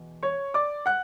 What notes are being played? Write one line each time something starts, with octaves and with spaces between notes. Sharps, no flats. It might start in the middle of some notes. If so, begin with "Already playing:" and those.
Already playing: E2 B2
C#5 C#6
D5 D6
F#5 F#6